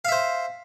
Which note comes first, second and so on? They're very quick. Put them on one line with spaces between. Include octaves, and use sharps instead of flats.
F5 E5 C5